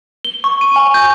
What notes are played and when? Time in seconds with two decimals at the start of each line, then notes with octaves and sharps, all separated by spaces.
0.25 G7
0.44 C#6
0.61 D#7
0.76 G#5
0.94 G6